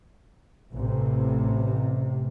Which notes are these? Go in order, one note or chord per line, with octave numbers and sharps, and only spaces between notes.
A1 C3